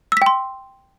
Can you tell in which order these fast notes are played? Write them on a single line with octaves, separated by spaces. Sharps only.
E6 B6 G5 C6